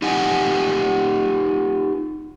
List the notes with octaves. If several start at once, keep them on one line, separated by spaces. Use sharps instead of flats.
D#4 F4 G4 F#5 G#5